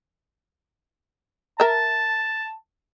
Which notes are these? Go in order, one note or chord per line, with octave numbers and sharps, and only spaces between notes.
A#4 E5 A5